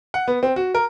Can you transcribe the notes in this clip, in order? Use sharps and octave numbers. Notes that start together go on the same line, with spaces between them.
F#5
B3
C4
F#4
A#4